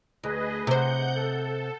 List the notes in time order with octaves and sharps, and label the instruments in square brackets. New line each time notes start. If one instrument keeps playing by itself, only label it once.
[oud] D2 [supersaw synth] G#4 B4 D#5
[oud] C3 C5 [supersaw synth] F#5 G6
[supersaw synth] A4